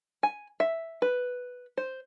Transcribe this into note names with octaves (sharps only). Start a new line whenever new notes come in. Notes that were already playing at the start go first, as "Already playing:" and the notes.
G#5
E5
B4
C5